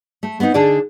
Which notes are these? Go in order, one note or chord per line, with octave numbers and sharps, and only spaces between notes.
A3
B3 C4 D4 D#4
D3 D4 D#4 G#4 D5